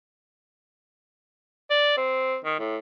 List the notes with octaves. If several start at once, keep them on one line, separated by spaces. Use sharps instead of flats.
D5
C4
D#3
A2